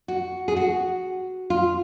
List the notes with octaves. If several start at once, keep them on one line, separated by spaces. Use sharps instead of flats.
F#4
G#4
F#4
F4